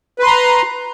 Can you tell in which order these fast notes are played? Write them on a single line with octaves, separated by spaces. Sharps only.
B4 C6 A#5